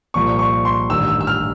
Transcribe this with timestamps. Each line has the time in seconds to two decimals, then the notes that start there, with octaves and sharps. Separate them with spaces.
0.14 C2 A#2 F3 C#6
0.39 C#6
0.65 C6
0.89 A1 G2 D#3 E6
1.08 E6
1.21 E6
1.27 F6